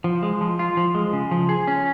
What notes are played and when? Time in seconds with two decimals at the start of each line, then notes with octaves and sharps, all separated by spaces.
0.04 F3
0.23 G#3
0.41 F3
0.59 F4
0.77 F3
0.95 G#3
1.13 C#3
1.31 F3
1.49 G#4
1.68 C#4